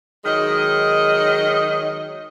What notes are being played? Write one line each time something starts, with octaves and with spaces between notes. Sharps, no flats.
D#3 F#3 G#3 D#5